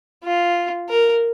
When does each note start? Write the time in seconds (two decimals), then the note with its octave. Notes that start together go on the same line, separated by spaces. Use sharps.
0.24 F4
0.89 A#4